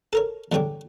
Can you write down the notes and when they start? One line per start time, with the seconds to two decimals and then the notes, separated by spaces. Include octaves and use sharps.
0.13 A4 A#4 C#5
0.52 E2 G2 D3 C#5 G5 D6